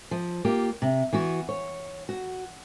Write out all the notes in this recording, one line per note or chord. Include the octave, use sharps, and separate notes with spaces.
F3
A#3 F4 G4
C3
E3 B3 F#4
C#5
F#4